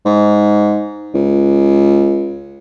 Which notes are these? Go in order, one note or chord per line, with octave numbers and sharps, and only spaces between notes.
G#2
C#2